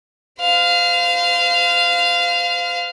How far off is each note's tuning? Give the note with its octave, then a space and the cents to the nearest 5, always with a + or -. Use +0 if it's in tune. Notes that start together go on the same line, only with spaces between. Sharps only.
C5 -40 F5 +0